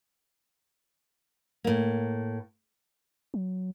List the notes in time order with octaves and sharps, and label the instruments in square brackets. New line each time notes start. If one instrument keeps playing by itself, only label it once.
[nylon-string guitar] A2 A#3
[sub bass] F#3